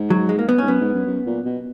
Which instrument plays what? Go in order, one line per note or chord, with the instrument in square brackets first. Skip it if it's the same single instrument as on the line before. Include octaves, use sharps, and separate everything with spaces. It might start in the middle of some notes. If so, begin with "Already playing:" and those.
Already playing: [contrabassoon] G#2
[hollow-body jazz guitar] F#3
G#3
A#3
B3
[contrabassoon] G#2 [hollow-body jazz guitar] C#4
[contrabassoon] F#2 [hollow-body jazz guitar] B3
[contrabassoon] G#2
F#2
F#2
A#2
B2